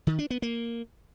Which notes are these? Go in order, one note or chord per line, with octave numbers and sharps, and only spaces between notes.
D#3
D4
B3
A#3